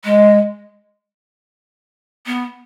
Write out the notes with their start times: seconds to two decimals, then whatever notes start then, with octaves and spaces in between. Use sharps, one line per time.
0.04 G#3
2.26 B3